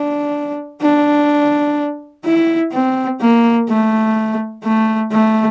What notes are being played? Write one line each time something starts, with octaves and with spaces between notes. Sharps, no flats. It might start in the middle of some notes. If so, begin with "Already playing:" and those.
Already playing: D4
D4
E4
C4
A#3
A3
A3
A3